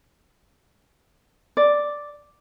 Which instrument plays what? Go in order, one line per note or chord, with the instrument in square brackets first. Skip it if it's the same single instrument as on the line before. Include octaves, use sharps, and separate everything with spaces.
[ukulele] D5